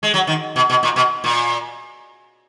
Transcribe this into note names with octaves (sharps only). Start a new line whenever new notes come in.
G#3
F#3
D#3
B2
B2
A#2
B2
A#2